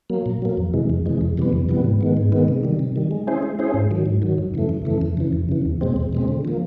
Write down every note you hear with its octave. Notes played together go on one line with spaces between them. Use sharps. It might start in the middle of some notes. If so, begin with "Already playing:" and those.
F#3 A#3
A#2
F#3 A#3
F2
C3 E3 G#3
F2
C3 E3 G#3
F2
C3 E3 G3 B3
F2
C3 E3 G3 B3
G#2
D#3 G#3 B3
G#2
D#3 G#3 B3
C3
D#3 G3
C3
D#3 G3
G#3
C#4 E4 G#4 C5
G#3
C#4 E4 G#4 C5
G#2
D#3 F#3
G#2
D#3 F#3
F#2
C#3 E3 A3
F#2
C#3 E3 A3
F2
C#3 E3
F2
C#3 E3
E2
B2 G#3 C4
E2
B2 G#3 C4
D3
F3 A#3